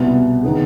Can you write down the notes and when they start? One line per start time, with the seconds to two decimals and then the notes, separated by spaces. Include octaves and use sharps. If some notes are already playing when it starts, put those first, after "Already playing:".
Already playing: C2 B2 B3
0.43 D#3 B3 D#4 G#4